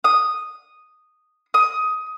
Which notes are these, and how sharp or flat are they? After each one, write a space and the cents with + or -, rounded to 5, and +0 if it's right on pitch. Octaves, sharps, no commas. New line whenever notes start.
D#6 -5
D#6 +15